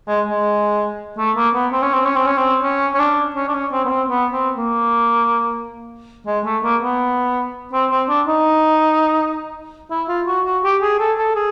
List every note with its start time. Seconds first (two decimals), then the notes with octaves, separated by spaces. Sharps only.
0.08 G#3
0.26 G#3
1.18 A3
1.36 A#3
1.54 B3
1.72 C4
1.82 C#4
1.93 C4
2.05 C#4
2.16 C4
2.26 C#4
2.37 C4
2.63 C#4
2.94 C#4
2.99 D4
3.35 C#4
3.48 D4
3.54 C#4
3.72 C4
3.85 B3
3.90 C4
4.09 B3
4.33 C4
4.57 A#3
6.27 G#3
6.45 A3
6.63 A#3
6.82 B3
7.73 C4
7.91 C4
8.09 D4
8.27 D#4
9.91 E4
10.09 F4
10.27 F#4
10.45 F#4
10.64 G4
10.82 G#4
10.99 A4
11.18 A4
11.36 G#4